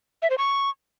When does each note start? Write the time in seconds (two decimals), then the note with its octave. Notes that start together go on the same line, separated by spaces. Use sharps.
0.22 E5
0.30 C5
0.38 C#6